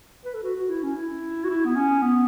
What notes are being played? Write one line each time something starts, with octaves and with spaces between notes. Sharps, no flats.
B4
A4
F#4
F#4
E4
C#4
E4
F#4
E4
B3
C#4
B3